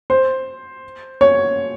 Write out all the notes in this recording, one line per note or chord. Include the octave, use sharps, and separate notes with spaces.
C5
C#5